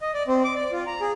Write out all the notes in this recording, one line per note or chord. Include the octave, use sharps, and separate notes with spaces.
D#5
D5
C4
D6
D5
F4
A#5
G#4